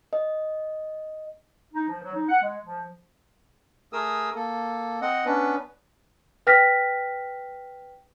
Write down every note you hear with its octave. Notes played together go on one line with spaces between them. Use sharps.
D#5
D#4
F3
F#3
D#4
F#5
G#3
F3
A3 G#4 A#4 D#6 E6
A#3 A4
C4 D#5 F#5
B3 C#4 D4 B4
B4 G5 F6 A#6 B6